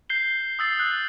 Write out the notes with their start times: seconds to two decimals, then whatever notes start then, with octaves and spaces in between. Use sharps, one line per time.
0.10 G6 C7 G7
0.59 D#6 E6 A6 C7
0.79 F#6